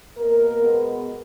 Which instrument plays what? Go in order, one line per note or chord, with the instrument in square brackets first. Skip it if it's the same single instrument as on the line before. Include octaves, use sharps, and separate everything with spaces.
[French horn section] B2 A#3 A#4
B2 G#3 B3